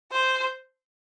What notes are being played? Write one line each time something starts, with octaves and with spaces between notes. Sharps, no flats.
C5